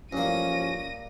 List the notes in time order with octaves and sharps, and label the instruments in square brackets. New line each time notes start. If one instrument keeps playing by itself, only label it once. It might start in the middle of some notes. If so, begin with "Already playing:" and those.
[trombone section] A1 F3 [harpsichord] G2 A#3 [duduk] C#4 [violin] A#6 D#7